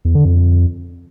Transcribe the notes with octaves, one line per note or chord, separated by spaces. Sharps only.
E2
D3
F2